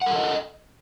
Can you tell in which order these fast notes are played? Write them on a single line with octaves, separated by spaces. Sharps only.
F#5 A#4 A4 D#5